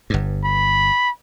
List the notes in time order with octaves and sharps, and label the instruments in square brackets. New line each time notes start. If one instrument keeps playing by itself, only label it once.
[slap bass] G1 G2
[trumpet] B5